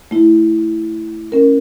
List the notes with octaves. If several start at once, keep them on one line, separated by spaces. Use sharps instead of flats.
A3 E4
C#4 A#4